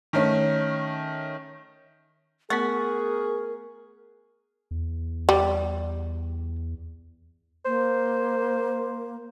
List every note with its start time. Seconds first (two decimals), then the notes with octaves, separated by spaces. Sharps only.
0.13 D#3 A3 C#4
2.50 A3 B3 F#4 G#4 A#4
4.71 E2
5.29 G3
7.65 A#3 C5